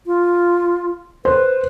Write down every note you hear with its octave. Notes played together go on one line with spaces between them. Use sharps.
F4
B4 C5